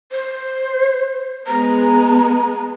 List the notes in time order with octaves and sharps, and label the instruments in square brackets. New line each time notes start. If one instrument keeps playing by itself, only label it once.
[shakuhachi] C5
[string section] G#3 B3 [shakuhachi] A#5